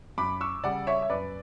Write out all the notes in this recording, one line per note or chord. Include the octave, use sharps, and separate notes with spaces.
F#2 B5 D6
C#6 E6
C#3 G3 D5 F#5
C#5 E5
E5
F#2 B4 D5